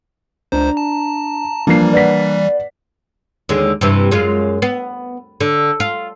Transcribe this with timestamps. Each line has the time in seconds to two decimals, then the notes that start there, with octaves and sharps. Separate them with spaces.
0.52 C#2 D4 C5 A#5
0.77 A5
1.67 E3 F3 G3 A#3 D4 C7
1.93 B4 D5 F#5 B6
3.49 D#2 D3 G#3
3.81 G2 C3 E3
4.11 F#2 G#3 F4
4.62 B3
5.41 D3
5.80 F4